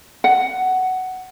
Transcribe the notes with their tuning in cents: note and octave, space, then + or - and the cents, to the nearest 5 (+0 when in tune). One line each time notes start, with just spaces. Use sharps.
F#5 +10